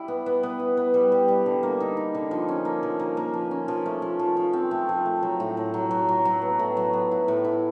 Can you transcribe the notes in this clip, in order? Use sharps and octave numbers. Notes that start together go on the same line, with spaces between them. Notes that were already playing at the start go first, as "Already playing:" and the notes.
Already playing: G3 E4
B3
B3
B3
E4
B3
G3
G3
G3
D3
A#3
D#4
D#4
D3
F3
C#4
A#3
F3
A#3
A#3
F3
C#4
F3
A3
F3
F3
F3
C4
A3
F3
A3
F#3
A2
A2
F#3
F#3
F#3
F#3
B3
A2
F#3
B3
E4
A2
E4